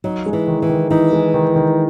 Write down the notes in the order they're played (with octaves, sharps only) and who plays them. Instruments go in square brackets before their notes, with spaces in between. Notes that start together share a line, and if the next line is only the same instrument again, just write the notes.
[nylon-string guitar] F#3 [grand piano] D#4
[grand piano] G#3
[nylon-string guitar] E3
[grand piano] D#3
[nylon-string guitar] E3
[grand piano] D#3
[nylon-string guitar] E3 [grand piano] D#4
[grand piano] G#3
D#3
D#3